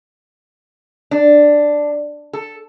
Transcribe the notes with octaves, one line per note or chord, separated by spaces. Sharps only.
D4
A4